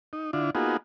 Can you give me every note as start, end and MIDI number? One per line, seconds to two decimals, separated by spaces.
0.13 0.31 63
0.33 0.50 50
0.33 0.50 62
0.33 0.50 64
0.33 0.50 65
0.55 0.77 58
0.55 0.77 59
0.55 0.77 63
0.55 0.77 65
0.55 0.77 66
0.55 0.77 68